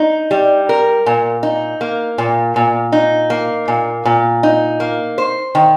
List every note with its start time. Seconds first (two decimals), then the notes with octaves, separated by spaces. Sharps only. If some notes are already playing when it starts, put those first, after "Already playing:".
Already playing: D#4
0.31 G3
0.69 A#4
1.06 A#2
1.43 D#4
1.81 A#3
2.18 A#2
2.56 A#2
2.92 D#4
3.30 A#3
3.68 A#2
4.05 A#2
4.43 D#4
4.80 A#3
5.18 C5
5.55 D#3